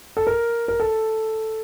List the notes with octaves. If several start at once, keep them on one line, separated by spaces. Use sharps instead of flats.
A4
A#4
A#4
A4